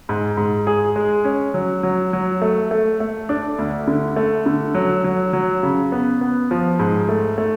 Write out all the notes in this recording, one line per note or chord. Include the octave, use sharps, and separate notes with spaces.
G#2
G#2
G#4
G#3
C#4
F#3
F#3
F#3
A3
A3
A3
D4
D2
D3
A3
D3
F#3
F#3
F#3
C#3
B3
B3
F3
G#2
A3
A3